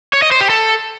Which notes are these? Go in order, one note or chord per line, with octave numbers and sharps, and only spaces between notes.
C#5
D#5
C5
G4
A4